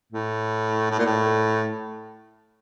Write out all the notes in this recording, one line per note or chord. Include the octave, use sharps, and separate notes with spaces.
A2
A2
A#2
A2